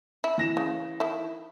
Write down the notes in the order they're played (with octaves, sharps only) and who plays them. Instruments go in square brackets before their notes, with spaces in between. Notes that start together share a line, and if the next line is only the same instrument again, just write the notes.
[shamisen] E4
[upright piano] E3 A#6 E7
[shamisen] C#3
D#3 E4